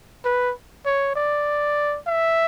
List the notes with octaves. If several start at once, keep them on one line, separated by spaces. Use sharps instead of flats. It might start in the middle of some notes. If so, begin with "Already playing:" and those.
B4
C#5
D5
E5